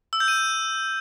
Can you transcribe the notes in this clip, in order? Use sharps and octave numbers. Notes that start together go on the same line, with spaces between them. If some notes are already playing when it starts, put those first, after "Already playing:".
E6
G6
D#7